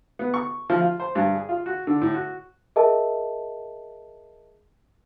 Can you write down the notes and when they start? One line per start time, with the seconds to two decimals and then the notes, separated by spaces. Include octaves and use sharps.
0.19 B3
0.34 C#6
0.70 F3
0.81 F4
1.00 C5
1.15 G2
1.35 G#4
1.49 F4
1.66 F#4
1.87 D3
2.01 A2
2.14 F#4
2.76 G#4 A#4 D#5 E5 A5